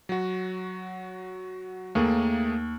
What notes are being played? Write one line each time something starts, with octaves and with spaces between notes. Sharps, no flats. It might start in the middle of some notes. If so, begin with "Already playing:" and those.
F#3 F#4
D#2 A3 A#3 G#4